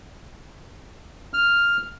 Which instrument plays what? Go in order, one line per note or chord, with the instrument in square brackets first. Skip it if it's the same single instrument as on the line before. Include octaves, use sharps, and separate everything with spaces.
[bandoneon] F6